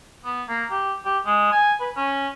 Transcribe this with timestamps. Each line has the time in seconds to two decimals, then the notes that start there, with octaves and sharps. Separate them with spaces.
0.25 B3
0.49 A#3
0.71 G4
1.05 G4
1.26 G#3
1.52 G#5
1.80 B4
1.97 C#4